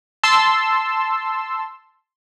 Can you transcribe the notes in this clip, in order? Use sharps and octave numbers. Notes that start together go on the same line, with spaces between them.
A5 C6 E6